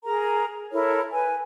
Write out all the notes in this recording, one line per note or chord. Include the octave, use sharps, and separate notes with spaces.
G#4 A#4 A#5
E4 A4 A#4 C#5
B4 G#5